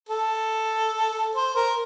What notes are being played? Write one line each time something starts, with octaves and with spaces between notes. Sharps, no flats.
A4
C5
A#4